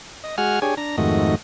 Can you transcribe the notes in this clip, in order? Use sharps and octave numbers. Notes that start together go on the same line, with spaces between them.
D#5
G#3 F#4 F#5 G#5 F6
D4 G4 G#4 C#5 G#5
D4 A#5
F2 G#2 D#3 A3 F#4 D#5